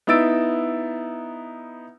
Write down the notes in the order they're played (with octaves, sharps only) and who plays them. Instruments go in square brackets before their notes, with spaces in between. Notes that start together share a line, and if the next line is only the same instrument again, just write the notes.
[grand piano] B3 D#4 E4 E6 A6 D7